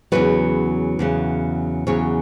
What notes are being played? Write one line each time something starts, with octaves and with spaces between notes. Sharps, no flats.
E2 C#3 F#3 B4
E2 C#3 F#3
E2 C#3 F#3 C#5